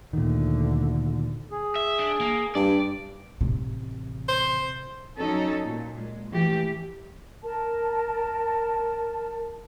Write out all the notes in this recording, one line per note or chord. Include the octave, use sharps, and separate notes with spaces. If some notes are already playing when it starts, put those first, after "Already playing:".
D2 A#2 D3 D#3
G#4
E5
D4
A#3
G2 D5
A1 C3
C5
F#3 C#4 D#4 A4
A#2
G#3
E3 A3 G4
A#4 A5